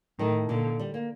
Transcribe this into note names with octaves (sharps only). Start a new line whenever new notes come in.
A2 D#3
A#2 D3
G3
A#3